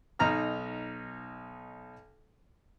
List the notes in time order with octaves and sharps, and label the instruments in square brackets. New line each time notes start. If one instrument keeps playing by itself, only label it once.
[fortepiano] B1 D#4 A#5 F6